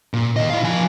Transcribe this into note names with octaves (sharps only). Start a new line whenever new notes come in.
A#2
D#2 D#5
E4 F5
F3 G#5